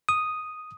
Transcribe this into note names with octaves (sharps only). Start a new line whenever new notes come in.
D#6